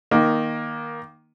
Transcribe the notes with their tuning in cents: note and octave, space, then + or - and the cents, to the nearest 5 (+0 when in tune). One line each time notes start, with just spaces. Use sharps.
D#3 +0 A#3 +15 D#5 +0